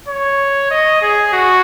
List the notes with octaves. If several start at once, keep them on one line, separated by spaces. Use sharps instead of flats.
C#5
D#5
G#4
F#4